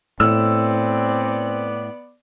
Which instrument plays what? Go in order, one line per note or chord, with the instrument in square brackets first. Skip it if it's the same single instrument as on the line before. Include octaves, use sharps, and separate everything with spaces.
[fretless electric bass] A2 [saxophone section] B3 D5 [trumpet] C4 [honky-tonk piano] E6